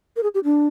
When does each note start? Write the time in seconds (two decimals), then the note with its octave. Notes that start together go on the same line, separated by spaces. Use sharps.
0.16 A#4
0.23 G#4
0.34 G4
0.44 D4